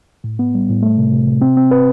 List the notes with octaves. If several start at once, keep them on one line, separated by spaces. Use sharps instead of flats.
A2
B3
G3
A2
A3
C3
C3
C3
C4
C4
B4